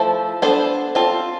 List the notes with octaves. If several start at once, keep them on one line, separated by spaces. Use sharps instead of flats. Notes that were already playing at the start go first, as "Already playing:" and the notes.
Already playing: F3 A3 E4 A4 C5
B3 D4 A4 C5
C4 F4 A4